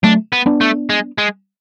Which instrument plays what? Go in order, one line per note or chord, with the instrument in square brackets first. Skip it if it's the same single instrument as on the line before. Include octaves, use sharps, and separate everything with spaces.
[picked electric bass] F#3 A3 [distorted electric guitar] D4
[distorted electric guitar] B3
[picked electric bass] B3 D4
[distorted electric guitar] A3
G#3
G#3